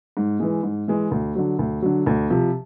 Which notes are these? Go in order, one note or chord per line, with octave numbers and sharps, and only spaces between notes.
G#2
E3 G#3
G#2
E3 G#3
D2
D3 F#3
D2
D3 F#3
D2
C3 F3